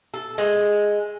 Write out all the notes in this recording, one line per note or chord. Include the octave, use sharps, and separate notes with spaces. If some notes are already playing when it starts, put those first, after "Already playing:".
A4
G#3